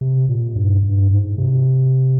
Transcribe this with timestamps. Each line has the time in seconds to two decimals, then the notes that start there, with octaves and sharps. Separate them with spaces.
0.01 C3
0.29 A#2
0.56 G2
0.83 G2
1.11 G#2
1.38 C3